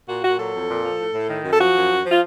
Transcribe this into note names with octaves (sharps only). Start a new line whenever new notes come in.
A#2 F#4
A#2 F#4
F#3 A4
F2
A#2
F3
A2
A2
D#3
F#2
A4
F3 F#4
F#2
F#2
F3
F4